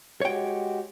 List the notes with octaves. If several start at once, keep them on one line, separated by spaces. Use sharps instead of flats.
G#3 F#4 G4 C#5 G5